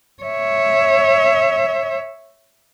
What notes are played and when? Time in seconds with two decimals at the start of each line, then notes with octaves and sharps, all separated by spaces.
0.23 C#5 E5